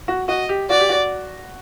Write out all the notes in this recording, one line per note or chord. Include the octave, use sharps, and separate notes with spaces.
F#4
F#4 D#5
G4
F#4 D5
G4
F#4